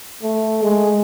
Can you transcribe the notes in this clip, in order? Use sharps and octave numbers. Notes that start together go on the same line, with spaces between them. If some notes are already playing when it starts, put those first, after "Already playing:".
A3
G#3